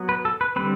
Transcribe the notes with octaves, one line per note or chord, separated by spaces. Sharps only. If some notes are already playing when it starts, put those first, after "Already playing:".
Already playing: F#3 B3
B4
A4
B4
D3 G3 C4 B4